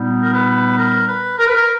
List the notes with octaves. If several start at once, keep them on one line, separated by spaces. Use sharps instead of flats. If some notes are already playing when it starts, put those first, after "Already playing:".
Already playing: A#2 G3 B3 D#4
A#4
B4
A#4
B4
A#4
B4
A#4